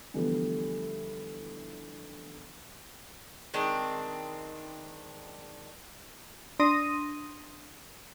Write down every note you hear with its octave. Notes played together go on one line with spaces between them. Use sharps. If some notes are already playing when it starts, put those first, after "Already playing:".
D3 E3 F3 G3 A3 B3
D#3 G#3 C4 D4
D4 C6 D#6 A#6 D#7